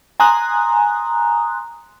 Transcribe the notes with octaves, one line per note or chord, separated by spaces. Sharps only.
G#5 A#5 C6 D#6 F#6